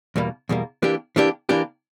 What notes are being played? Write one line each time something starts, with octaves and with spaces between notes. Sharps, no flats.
E2 B2 G3 A#3
E2 B2 G3 A#3
E3 A#3 D4 G4
E3 A#3 D4 G4
E3 A#3 D4 G4